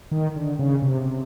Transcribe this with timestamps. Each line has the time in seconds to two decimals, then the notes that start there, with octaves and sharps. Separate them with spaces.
0.11 D#3
0.36 D3
0.59 C#3
0.82 C3
1.05 C3